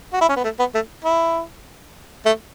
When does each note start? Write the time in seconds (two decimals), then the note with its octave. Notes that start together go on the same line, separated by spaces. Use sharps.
0.13 F#4
0.21 E4
0.29 C#4
0.36 B3
0.44 A3
0.59 B3
0.74 A3
1.04 E4
2.25 A3